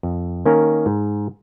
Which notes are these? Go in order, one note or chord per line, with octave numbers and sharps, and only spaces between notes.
F2
D#3 A#3 C#4 A#4
G#2